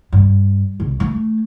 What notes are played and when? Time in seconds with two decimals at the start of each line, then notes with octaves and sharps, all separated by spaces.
0.12 G2
0.80 C2
1.00 A3